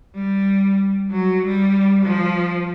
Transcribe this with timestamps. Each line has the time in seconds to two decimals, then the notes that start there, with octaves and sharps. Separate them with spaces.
0.15 G3
1.11 F#3
1.46 G3
2.06 F3